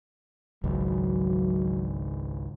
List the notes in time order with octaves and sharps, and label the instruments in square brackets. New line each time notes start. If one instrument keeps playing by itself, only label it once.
[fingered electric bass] G#1 C#2 [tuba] F#3